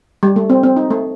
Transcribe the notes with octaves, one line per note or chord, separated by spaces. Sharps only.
G3
A3
C4
C4
D#4
A3